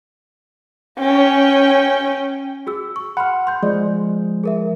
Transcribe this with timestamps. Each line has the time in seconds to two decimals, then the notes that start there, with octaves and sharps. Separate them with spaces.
0.99 C#4 G5
2.67 F#4 G#4 E6
2.96 C#6
3.17 F#5 B5 C6 F6
3.47 C6 G6
3.63 F3 G#3 D5
4.44 G#4 A#4 E5